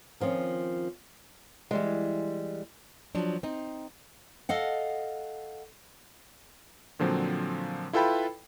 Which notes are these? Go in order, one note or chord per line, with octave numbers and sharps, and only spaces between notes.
D#3 F3 C4 C#4
E3 G3 G#3
F3 F#3 D4
C4 D#4
A4 D#5 F5 F#5
A#2 D3 F3 F#3 C4
E4 F4 A4 B4 G5 B5